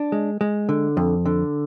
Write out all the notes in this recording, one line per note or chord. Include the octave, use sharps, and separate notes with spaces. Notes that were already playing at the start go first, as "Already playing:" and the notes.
Already playing: D4
G#3
G#3
D3
F2
D3